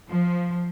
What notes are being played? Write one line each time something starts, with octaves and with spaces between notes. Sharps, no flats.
F3